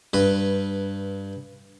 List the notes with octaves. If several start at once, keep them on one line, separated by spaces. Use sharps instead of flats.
G2 B4